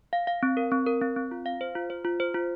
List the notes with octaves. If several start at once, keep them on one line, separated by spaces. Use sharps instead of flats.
F5
F5
C4
A#4
C4
A#4
C4
C4
F4
F5
C5
F4
C5
F4
C5
F4